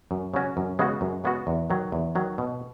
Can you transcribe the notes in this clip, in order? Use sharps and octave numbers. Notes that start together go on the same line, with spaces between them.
F#2
C#3 F#3 C#4 F#4
F#2
C#3 G#3 B3 F#4
F#2
C#3 G#3 B3 F#4
E2
D#3 F#3
E2
D#3 F#3
B2